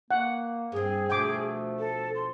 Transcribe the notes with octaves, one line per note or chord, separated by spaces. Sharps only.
A#3 F#5
G2 C4 G#4
D2 B2 F3 A3 G5 D6
A4
C6